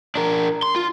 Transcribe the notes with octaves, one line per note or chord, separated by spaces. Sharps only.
D4 A#4
C6
F4